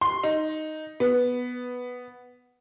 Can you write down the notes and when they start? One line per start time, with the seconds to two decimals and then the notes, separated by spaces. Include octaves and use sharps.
0.01 C6
0.24 D#4
1.00 B3